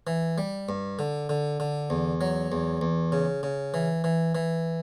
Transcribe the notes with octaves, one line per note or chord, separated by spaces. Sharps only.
E3
G3
G2
D3
D3
D3
E2
F#3
E2
E2
C#3
C#3
E3
E3
E3